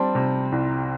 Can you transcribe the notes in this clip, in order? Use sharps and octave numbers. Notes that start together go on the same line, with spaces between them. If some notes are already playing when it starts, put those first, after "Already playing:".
Already playing: G3 C4 D4
C3
C2